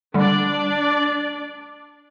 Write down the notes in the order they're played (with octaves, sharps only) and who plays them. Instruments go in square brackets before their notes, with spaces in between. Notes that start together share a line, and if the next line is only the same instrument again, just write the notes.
[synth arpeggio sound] D3 G3 [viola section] D4 D5